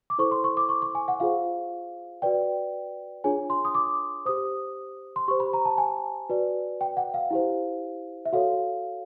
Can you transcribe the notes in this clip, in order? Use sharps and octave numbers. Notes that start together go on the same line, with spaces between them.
D6
E4 A4 C5 C#6
C6
C#6
D6
C#6
C#6
G#5
F#5
F4 G#4 C5 F5
F#4 B4 D5 G5
D4 F4 G#4 C#5 G#5
C6
D#6
D6
G4 C5 D#6
C6
G4 C5 C#6
B5
A#5
A5
G#5
F#4 B4 D5
G5
F#5
F5
E4 G4 C5
E5
F#4 A4 C#5 F5